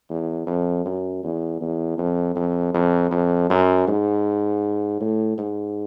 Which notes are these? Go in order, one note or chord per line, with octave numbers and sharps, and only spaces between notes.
E2
F2
F#2
E2
E2
F2
F2
F2
F2
F#2
G#2
A2
G#2